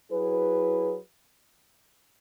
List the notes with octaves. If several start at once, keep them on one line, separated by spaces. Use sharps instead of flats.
F#3 E4 G#4 B4